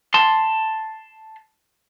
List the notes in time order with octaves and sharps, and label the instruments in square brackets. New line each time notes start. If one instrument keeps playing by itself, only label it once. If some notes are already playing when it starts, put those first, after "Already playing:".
[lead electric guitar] A5 C6